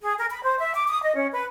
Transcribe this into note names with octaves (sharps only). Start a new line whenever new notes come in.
G#4
A#4
B5
C5
E5
D6
D#6
D#5
C#4
B4